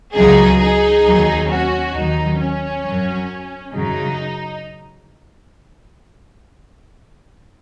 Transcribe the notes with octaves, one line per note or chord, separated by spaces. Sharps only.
C#2 C#3 F#3 D#4 G#4
D#4 G#4
D#2 D#3 F#3
C#4 F#4
D#2 D#3 F#3 D#4
C#4
F#2 F#3
F#2 C#3 F#3 D#4